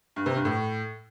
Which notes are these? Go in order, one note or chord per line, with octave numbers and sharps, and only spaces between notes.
G2
C3
G2
A2